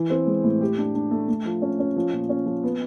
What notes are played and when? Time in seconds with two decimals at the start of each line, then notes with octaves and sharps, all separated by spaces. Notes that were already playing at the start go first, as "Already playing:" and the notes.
Already playing: E3
0.10 C4
0.27 G#3
0.44 A2
0.61 G4
0.78 D4
0.95 D4
1.11 A3
1.28 A3
1.45 F3
1.62 C#4
1.79 C#4
1.96 F3
2.13 A#2
2.29 C#4
2.46 F3
2.64 B3